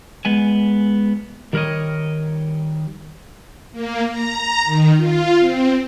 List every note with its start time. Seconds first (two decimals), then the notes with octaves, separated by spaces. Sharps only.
0.25 G#3 B3 G#5
1.53 D#3 G3 A#4 B4 C#5 D#5
3.72 A#3
4.08 A#5
4.65 D#3
4.97 F4
5.40 C4